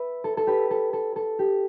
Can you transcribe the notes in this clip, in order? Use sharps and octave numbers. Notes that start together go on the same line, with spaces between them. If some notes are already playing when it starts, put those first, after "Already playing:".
Already playing: B4 E5
A4
A4
G4 B4
A4
A4
A4
G4